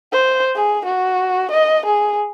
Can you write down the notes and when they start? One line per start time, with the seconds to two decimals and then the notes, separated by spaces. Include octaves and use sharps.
0.12 C5
0.55 G#4
0.85 F#4
1.51 D#5
1.85 G#4